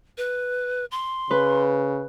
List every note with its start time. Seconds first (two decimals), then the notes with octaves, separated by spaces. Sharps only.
0.18 B4
0.91 C6
1.31 C#3 B4